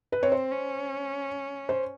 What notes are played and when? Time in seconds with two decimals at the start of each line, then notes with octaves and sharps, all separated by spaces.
0.12 B4
0.22 C4 C#5
0.32 C5
0.51 C#4
1.69 C5